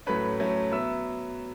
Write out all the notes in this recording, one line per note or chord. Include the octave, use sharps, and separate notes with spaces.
A2 F#3 A3 C#4 B4 B5
A2 F#3 A3 C#4
F#3 B3 E5 E6